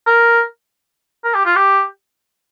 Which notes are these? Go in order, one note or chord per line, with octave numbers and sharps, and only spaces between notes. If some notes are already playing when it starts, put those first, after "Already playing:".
A#4
A#4
G4
F4
G4